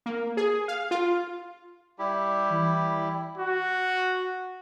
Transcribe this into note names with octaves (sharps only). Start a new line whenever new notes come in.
A#3
G#4
F5
F4
G3 E4 G4
E3
F#4